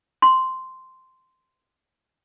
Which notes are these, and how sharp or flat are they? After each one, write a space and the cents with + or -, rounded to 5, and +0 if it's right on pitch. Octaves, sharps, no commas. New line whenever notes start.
C6 -5